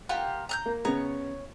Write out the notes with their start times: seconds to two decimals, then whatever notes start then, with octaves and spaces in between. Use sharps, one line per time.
0.09 F4 G4 A#4 F#5
0.49 A#5 F#6 G6
0.66 A#3
0.85 C#3 B3 C#5 A#5